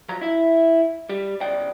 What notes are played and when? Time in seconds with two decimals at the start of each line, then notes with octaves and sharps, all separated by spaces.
0.09 F3 F#3 A#5
0.21 E4 E5
1.09 G3
1.41 C#2 B2 D5 G5